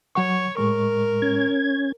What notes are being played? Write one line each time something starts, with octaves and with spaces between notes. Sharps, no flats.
F#3 C#5 F#5 C#6
A2 G#3 A#4 C#6
C#4 G#6